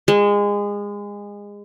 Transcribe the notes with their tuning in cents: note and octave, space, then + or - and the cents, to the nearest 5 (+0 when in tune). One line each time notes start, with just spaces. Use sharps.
G#3 -25